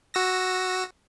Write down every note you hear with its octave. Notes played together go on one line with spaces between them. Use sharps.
F#4 E6 A#6